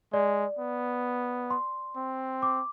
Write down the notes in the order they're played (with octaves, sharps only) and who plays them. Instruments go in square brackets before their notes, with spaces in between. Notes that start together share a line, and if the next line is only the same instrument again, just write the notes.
[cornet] G#3 [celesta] D5
[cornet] B3
[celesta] C6
[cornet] C4
[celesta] D6